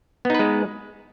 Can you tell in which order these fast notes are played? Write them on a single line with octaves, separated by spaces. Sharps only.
B3 D#4 B4 G#3